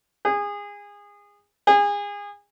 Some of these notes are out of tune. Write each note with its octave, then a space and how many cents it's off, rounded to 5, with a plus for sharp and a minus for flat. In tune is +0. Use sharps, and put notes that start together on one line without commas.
G#4 -25
G#4 -30